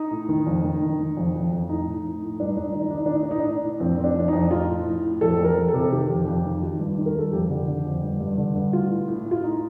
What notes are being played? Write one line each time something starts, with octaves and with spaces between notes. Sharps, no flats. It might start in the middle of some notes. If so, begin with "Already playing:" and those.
Already playing: D#4
A2
D#3
F2
D#3
D#3
D#3
F2
F2
F2
A2 D#4
A2
A2
A2
G2 D4
D#4
G2 D4
D#4
D#3 D4
D#4
D#3 D4
D#4
D4
A2 D#4
D4
A2 D#4
D4
A2
A2
F2 C4
F2 C4
D4
F2 D4
F2 D#4
A2 F4
A2
A2
A2
F2 A4
F2
A#4
F2
A4
C3
D#3 G4
F2
F2
D#3
D#3 F4
G2
D#3
A#4
G2 A4
F2 G4
D3
D3
F2
G2
G2
D3
G2
A2 F4
A2
A2
A2
F4
D#4